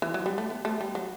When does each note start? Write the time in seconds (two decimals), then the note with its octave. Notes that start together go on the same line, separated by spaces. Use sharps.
0.02 E3
0.14 F#3
0.26 G3
0.38 A3
0.50 B3
0.65 A3
0.81 G3
0.95 F#3